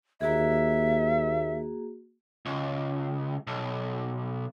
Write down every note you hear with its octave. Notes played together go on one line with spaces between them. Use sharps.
D#2 A#3 F#4 G#4 E5
C#2
B1